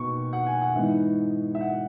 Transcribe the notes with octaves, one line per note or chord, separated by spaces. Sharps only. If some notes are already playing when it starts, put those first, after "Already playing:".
Already playing: B2 A#3 D#4 C#6
F#5
G#5
F#5
G#2 E3 B3 D#4 E5
E5
F#5